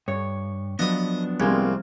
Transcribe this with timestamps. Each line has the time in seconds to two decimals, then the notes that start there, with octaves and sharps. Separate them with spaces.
0.08 G2 C#5
0.79 F3 F#3 B3 D4 B4 D#5 D#6
1.40 C2 G#3 A#3 C4 F6